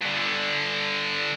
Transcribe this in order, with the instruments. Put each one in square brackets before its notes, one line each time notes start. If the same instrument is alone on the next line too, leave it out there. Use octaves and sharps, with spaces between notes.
[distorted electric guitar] G2 D3